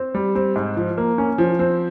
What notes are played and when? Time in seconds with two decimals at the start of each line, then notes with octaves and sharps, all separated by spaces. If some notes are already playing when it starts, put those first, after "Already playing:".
Already playing: C4
0.15 G3
0.35 C4
0.56 G#2
0.77 F3
0.98 A#3
1.18 C#4
1.38 F3
1.59 C4